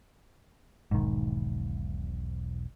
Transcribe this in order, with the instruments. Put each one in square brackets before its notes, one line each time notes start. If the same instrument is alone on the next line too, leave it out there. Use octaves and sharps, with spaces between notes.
[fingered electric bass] E1 B1 [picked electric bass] G#2 D#3